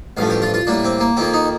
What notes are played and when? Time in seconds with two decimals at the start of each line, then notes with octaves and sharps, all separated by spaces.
0.17 A1 G2 F3 A3 F5
0.30 G4
0.42 F4
0.54 F4
0.67 A2 G3 A#3 D4
0.84 C4
1.00 A#3
1.17 F2 D#3 A#3 C4
1.34 D#4